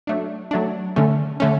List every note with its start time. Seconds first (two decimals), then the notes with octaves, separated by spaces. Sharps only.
0.07 F#3 A3 D4
0.51 F#3 A3 D4
0.96 D3 A3 C#4
1.40 D3 A3 C#4